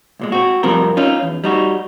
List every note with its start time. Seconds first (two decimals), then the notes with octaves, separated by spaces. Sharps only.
0.20 C2 A#2 G#3
0.32 C4 F#4
0.63 F2 C3 F3 G3 C4 A#4
0.97 C#4 D#4 F4
1.23 E2
1.44 G3 D#4 F#4